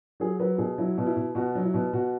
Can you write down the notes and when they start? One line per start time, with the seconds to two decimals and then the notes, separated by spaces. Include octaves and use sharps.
0.20 F#3 G#4
0.39 F#3 B4
0.58 B2 G#4
0.78 F#3 E4
0.98 B2
1.06 E4
1.16 B2
1.35 B2 F#4
1.55 F#3
1.64 E4
1.74 B2
1.93 B2 F#4